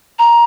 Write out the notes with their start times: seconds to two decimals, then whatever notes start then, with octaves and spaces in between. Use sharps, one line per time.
0.19 A#5